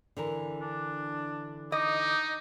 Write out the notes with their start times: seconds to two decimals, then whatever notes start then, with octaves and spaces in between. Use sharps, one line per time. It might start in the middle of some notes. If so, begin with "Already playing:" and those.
0.17 D3 E3 A#4
0.61 D4
1.72 D#4 D#5 D6